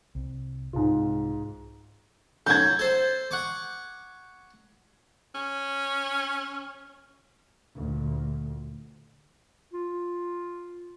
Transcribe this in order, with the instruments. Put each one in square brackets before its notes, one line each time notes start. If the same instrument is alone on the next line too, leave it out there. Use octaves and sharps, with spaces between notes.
[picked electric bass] C2
[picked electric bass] C2 [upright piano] G#2 F4
[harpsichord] F#3 A4 [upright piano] G6 G#6
[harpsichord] A4 C5
F#5 C#6 D6
[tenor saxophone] C#4
[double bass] D2 A#2
[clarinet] F4